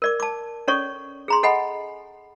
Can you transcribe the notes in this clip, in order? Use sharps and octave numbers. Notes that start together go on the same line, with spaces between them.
A#4 D5 D6
A5 D6
C#4 A4 C#5 D5 C#6
G#4 A#5 C6
A4 D#5 F#5 G#5 B5